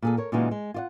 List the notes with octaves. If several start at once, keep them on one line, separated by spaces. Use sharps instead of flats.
A#2 G#4 A4
A#4 C#5
A#2 C#3 E3 G#3 D#4 F#4
G#3
F4 D5 F#5